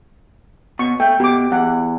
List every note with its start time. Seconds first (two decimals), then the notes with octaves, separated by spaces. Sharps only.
0.79 B2 C#6
1.00 A3 G5
1.20 B2 G4 D6
1.52 E2 F#5